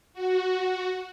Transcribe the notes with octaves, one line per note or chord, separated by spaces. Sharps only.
F#4